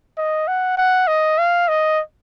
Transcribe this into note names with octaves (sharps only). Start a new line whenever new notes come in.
D#5
F#5
F#5
D#5
F5
D#5